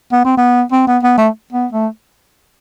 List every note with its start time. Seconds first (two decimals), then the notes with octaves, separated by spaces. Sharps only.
0.13 B3
0.25 C4
0.37 B3
0.72 C4
0.87 B3
1.03 B3
1.18 A3
1.53 B3
1.73 A3